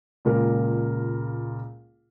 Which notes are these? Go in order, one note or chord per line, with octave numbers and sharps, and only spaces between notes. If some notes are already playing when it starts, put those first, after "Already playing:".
C#2 A#2 A#4